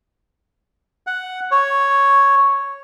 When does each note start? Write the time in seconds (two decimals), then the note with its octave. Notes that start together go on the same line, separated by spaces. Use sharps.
1.07 F#5
1.51 C#5